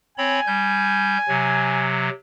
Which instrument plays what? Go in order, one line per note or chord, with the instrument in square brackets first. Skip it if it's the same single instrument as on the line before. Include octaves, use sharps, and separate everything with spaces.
[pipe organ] C4 C#5 B5 [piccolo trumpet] G#5
[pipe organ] G3 G6
C3 F#3